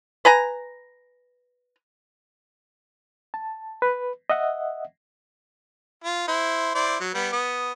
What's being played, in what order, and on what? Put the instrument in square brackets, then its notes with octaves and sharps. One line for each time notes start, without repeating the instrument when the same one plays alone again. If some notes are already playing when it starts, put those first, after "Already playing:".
[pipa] B4 G#5 A#5
[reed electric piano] A5
B4
D#5 E5 F#5
[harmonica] F4
E4 C5
E4 C5 D5
F#3
G3 B3
B3 D#6